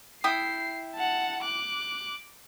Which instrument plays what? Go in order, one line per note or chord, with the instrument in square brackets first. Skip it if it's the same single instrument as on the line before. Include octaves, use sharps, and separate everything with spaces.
[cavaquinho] E4 G5 D#6 [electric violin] C7
[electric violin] F#5 A5
D6 F#6